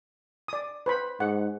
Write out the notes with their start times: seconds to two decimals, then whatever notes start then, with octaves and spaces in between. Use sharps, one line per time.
0.48 D5 D#6
0.86 B4 C5 B5
1.20 G#2 F#5